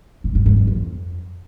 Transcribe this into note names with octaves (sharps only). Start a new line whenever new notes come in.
A2
G#2
G#2
G2
F2